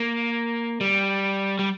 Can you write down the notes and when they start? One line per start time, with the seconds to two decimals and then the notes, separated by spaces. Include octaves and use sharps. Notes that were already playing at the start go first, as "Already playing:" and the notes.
Already playing: A#3
0.81 G3
1.59 G3